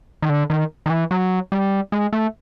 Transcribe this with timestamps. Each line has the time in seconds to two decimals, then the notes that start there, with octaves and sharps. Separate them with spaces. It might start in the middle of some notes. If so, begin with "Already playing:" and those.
0.22 D#3
0.29 D3
0.50 D#3
0.86 D#3
0.90 E3
1.11 F#3
1.52 G3
1.92 G#3
2.13 A3